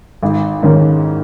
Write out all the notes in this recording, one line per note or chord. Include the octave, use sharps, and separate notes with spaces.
G#1
G#2 D#3 C#4